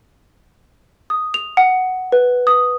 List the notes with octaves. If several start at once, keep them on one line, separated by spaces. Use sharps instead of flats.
D#6
F7
F#5
B4
D#6